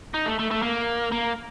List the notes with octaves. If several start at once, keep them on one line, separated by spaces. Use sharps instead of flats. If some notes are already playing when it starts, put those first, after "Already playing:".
D#4
A3
A3
A3
A#3
A#3